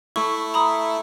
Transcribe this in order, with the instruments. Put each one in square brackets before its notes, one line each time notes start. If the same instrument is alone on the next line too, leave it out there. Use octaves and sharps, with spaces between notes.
[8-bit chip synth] A3 E4 [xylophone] C#6
[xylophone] A#5 B5 D#6